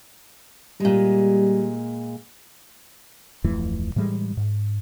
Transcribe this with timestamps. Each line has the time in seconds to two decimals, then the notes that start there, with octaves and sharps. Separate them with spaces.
0.80 A#2 G3 G#3
3.44 D1 F2 E3 A3
3.96 A2 E3 G3 G#3
4.37 G#2